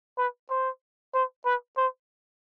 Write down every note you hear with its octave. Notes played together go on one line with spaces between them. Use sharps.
B4
C5
C5
B4
C5